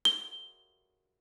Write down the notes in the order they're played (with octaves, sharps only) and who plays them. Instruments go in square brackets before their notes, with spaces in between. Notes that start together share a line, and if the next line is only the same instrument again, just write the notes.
[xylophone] G7